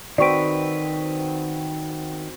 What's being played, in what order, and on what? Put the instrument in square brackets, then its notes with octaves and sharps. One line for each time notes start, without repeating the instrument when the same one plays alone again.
[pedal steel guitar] D#3 B4 [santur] C4 F#4 [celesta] D5 C#6 D7